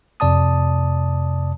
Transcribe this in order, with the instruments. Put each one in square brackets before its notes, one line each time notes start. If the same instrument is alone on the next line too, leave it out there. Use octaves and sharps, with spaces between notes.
[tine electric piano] F2 C3 D5 A5 D#6